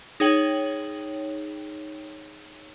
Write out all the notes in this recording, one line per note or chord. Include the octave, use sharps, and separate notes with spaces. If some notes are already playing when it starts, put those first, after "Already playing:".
D#4 G#4 C#5 G5 F#7